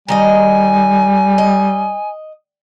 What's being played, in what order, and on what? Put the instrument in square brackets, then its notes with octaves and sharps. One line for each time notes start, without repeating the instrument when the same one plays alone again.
[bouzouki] D#3 D#4 D#5 [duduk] G3 [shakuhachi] G#5
[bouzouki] D#5